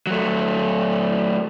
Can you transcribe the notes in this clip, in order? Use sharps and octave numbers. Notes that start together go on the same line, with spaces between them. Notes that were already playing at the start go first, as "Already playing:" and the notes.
F#3 A3